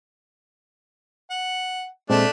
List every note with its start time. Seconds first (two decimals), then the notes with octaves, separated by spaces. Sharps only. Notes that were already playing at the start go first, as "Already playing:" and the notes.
1.30 F#5
2.10 A#2 G#3 A3 C4 D4